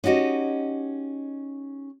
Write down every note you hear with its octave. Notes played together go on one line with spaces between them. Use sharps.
C#4 D#4 F#4 G4 D#5